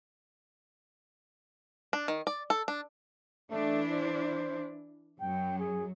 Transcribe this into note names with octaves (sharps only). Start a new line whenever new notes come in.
D4
D#3
D5
A4
D4
E3 A3 D4 E4
C5
F#2 F#3 G5
G#4